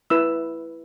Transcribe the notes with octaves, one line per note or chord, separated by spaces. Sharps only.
E4 B4 E6